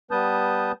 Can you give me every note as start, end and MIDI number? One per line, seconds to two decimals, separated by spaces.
0.11 0.72 55
0.11 0.72 59
0.11 0.72 71
0.11 0.72 81
0.11 0.72 87
0.11 0.72 91